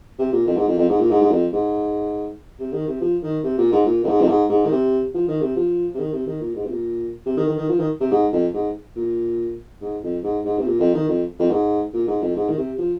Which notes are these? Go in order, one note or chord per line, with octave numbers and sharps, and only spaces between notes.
C3
A#2
F2
G#2
F2
F2
G#2
A#2
G#2
G#2
F2
G#2
C3
D#3
C3
F3
D#3
C3
A#2
G#2
A#2
F2
G#2
F2
G#2
G#2
D#3
C3
F3
D#3
C3
F3
C3
D#3
C3
D#3
A#2
G#2
C3
A#2
C3
D#3
D#3
D#3
F3
D#3
C3
G#2
F2
G#2
A#2
G#2
F2
G#2
G#2
C3
A#2
F2
D#3
F2
F2
G#2
A#2
G#2
F2
G#2
D#3
C3
F3